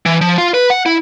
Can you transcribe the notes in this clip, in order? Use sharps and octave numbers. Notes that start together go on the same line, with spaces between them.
E3
F3
F4
B4
F#5
E4